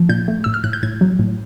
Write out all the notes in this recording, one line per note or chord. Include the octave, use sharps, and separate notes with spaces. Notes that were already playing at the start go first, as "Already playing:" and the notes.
Already playing: F3
A#2 G6
A3
A2 E6
F6
A2 F#6
G6
A2 G#6
F#3
A2